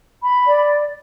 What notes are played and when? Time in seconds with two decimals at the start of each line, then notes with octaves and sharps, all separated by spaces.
0.23 B5
0.47 D5